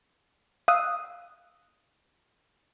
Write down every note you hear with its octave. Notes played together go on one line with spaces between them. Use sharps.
F5 D#6 E6 F#6 D#7